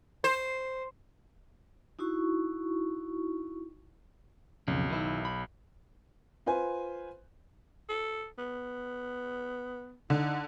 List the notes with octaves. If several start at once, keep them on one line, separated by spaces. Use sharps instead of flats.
C5
D#4 E4 F#4 C#6
B1 F2 C#3
D#3 E4
B5
F4 B4 C5 G#5
A4
B3
D3 D#4